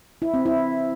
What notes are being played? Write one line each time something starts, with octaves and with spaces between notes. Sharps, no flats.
E4
C4
E4